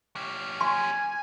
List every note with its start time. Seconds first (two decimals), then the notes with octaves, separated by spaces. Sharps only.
0.16 C#4 G4
0.61 G#5 C6